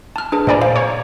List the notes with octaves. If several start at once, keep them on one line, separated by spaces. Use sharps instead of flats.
A5 F6
D4 G#4 B4
A#2 C5 D5 G#5 A#5
C5 F5
C#5